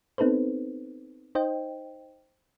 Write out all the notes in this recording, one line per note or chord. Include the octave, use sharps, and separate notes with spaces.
B3 C4 D#4 A4 B4 C5
D#4 C5 D#5 G5